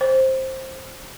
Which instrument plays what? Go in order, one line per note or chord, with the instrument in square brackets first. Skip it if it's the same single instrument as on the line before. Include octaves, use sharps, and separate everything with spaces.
[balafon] C5